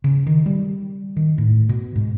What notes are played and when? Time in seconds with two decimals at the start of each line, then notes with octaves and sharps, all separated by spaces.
0.04 C#3
0.26 D#3
0.46 G3
1.17 D#3
1.38 A2
1.69 B2
1.96 G#2